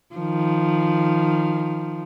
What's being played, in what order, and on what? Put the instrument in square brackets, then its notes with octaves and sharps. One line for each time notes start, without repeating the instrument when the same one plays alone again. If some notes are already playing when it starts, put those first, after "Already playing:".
[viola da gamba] D#3 F3